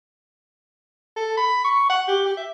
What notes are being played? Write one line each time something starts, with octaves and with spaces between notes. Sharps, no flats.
A4
B5
C#6
F#5
G4
G4
E5